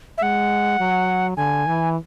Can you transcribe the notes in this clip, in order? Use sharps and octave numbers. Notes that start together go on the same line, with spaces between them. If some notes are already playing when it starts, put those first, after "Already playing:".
E5
G#3 F#5
F#3
D3 G#5
E3